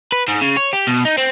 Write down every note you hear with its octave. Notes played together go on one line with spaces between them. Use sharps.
B4
G#2
C#3
C#5
G4
B2
D#4
C4